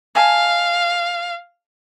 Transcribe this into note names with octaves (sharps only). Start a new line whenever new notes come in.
D#5 F5 G#5 A5